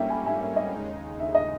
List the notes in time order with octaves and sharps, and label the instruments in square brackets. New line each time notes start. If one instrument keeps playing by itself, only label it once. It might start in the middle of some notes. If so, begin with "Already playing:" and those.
Already playing: [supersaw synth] G#2 G3 A#3 C#4 [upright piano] E5 G5
[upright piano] G#5 B5
E5 G#5
E5
D#5
[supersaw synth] D#2 C#3 G#3 D#4
[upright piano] E5
D#5